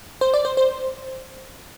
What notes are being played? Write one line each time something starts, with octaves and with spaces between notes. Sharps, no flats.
C5
D5
C5
C5